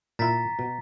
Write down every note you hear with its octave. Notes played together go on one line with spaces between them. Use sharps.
A#2 E4 A#5 A6 B6
B2